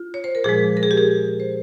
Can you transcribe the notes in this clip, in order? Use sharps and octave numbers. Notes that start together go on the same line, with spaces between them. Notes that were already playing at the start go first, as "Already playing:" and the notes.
Already playing: F4
C#5
C5
A#4
A#2 F3 G#3 G#4
A#4
G#4
G4
G#4
C5